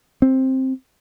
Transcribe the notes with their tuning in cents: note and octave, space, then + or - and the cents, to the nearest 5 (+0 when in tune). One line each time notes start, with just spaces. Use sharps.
C4 +10